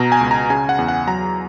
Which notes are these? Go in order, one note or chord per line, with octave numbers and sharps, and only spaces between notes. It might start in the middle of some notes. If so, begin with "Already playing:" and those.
Already playing: B2 A#5
G#5
C#2
A#5
C#3 G#5
F#5
E2
F#5
F#3 A#5